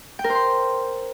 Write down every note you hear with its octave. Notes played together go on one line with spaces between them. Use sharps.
G5
A#4
C5
C6